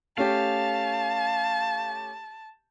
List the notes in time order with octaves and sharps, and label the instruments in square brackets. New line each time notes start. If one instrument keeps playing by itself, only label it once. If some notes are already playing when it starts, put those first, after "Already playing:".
[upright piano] A3 C#4 G4 [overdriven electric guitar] F5 [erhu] A5